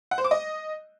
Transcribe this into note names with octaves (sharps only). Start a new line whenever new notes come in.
F#5
C5
D6
D#5